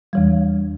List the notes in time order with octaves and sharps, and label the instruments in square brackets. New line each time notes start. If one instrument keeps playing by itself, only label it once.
[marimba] E2 E3 G3